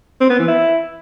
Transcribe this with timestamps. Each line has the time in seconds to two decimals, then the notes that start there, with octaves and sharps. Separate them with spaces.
0.21 C4
0.30 B3
0.39 E3
0.48 E4